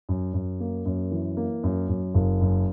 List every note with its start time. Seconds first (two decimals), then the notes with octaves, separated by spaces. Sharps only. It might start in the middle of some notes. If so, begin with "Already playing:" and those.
0.09 F#2
0.34 F#2
0.60 A#3
0.86 F#2
1.11 E3
1.37 A#3
1.64 F#2
1.89 F#2
2.14 F#1
2.41 F#2